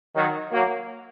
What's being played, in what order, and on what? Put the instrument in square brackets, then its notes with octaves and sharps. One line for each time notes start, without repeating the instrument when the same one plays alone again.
[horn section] D#3 F#3
F#3 A#3